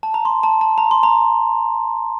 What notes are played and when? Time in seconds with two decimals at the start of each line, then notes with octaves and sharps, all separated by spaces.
0.03 A5
0.14 A#5
0.25 C6
0.43 A5
0.61 A5
0.78 A#5
0.91 C6
1.03 A#5